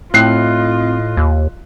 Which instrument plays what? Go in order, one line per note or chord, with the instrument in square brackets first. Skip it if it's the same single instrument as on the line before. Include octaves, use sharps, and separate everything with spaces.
[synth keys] A2 [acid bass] C4 [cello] F4 D#5 [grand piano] F#6 C7
[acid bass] D#2